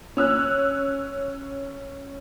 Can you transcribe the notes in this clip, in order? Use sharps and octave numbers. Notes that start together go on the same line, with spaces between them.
C#4 E6 F#6